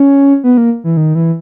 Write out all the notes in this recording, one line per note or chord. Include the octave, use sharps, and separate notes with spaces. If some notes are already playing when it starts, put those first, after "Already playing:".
Already playing: C#4
B3
A#3
E3
D#3
E3